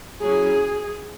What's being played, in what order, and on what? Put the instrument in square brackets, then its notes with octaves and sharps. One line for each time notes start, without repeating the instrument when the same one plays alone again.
[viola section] F#3 C#4 E4 G#4